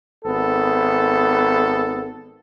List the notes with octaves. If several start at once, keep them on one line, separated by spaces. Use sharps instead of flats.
G#1 B3 A4